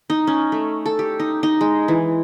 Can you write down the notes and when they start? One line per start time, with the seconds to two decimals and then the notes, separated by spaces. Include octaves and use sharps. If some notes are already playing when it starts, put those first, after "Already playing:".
0.10 D#4
0.27 C#4
0.52 A3
0.86 A4
0.99 G4
1.20 D#4
1.43 D#4
1.61 G#3
1.88 E3